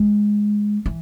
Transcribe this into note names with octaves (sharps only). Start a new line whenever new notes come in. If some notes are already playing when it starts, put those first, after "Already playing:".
Already playing: G#3
E3